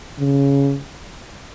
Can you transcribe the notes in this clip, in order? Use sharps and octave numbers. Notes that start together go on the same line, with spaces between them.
C#3